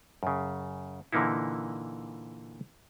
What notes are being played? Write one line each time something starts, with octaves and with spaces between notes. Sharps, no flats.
F#2 C#3
A#2 D3 E3 A#3 D#4 E4